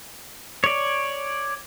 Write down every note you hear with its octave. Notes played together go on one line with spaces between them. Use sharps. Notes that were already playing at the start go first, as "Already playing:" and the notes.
C#5 D5